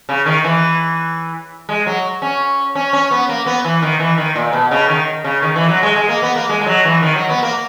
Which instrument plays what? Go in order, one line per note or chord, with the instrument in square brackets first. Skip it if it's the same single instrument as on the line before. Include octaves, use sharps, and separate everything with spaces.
[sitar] C#3
D#3
E3
G#3
F#3
C#4
C#4
C#4
B3
A#3
B3
E3
D#3
E3
D#3
A#2
B2
C#3
D#3
C#3
D#3
E3
F#3
G#3
G#3
A#3
B3
A#3
G#3
G#3
F#3
E3
D#3
F#3
B3
A#3